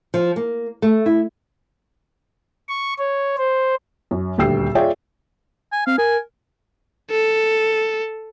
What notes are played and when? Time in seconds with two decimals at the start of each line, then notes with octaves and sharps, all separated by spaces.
0.14 F3
0.36 A#3
0.82 A3
1.06 E4
2.68 C#6
2.98 C#5
3.37 C5
4.11 F#2
4.38 D#1 D2 G4 G5 E6 C7
4.75 F4 G#4 C#5 D5 E5 G5
5.72 G#5
5.87 C4 F5
5.98 A#4 G#5
7.11 A4